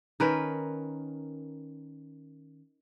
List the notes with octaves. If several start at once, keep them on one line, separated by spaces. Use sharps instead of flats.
D#3 C#4 A#4 B4